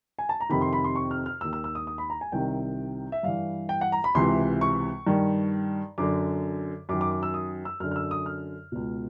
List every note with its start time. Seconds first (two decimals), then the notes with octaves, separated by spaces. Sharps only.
0.19 G#5
0.29 A5
0.41 A#5
0.49 F2 C3 D#3 B5
0.61 C6
0.73 B5
0.84 C6
0.96 C#6
1.11 F6
1.26 F6
1.41 D#2 D#3 E6
1.53 E6
1.64 E6
1.75 D#6
1.87 D#6
1.98 B5
2.10 A#5
2.21 G#5
2.32 C2 C3 D#3 G5
3.12 E5
3.23 G2 E3 F5
3.69 G5
3.81 F#5
3.92 A#5
4.04 B5
4.15 C#2 C3 E3 C6
4.61 C#6
5.07 G2 D#3
5.98 F#2 D3 D6
6.89 F#2 D6
6.93 D#3
7.01 D6
7.11 D6
7.23 E6
7.34 D#6
7.65 E6
7.80 F#2 F6
7.84 D3
7.91 F6
7.96 E6
8.11 D#6
8.26 F6
8.72 C#2 B2